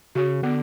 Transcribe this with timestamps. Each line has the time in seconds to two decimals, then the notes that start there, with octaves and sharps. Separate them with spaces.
0.15 C#3 F#4
0.42 D3 B3